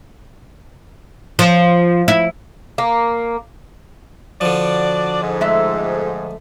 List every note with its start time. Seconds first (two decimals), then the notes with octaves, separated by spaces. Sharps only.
1.39 F3
2.08 E4
2.78 A#3
4.41 D3 F3 D4 F#4 D5
5.22 F2 G#2
5.41 G#3 A3 E5